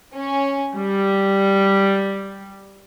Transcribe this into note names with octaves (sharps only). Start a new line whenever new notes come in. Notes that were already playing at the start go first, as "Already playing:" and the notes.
C#4
G3